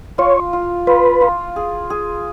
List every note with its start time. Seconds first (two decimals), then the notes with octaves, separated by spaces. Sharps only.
0.18 F4 C#5
0.53 F4
0.87 F4 B4
1.21 F4
1.56 G#4
1.90 G#4